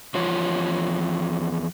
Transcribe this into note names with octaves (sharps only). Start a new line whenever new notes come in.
E2 F3 F4 C#5